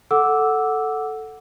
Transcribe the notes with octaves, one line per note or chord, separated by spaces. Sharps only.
A4 F#5 D6 E6